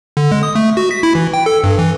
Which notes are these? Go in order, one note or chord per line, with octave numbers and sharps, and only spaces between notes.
D3
G#3
D#6
A3
F#4
B6
E4
E3
G5
A4
G2
E3